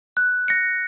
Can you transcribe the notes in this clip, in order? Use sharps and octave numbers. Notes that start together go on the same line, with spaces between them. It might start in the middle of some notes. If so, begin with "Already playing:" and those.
F#6
A#6 C#7